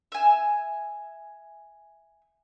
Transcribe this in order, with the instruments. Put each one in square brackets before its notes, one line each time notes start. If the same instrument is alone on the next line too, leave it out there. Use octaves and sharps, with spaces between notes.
[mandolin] E5 G#5